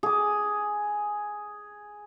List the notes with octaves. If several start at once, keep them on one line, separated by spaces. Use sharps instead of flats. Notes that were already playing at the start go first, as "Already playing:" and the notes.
G#4 D6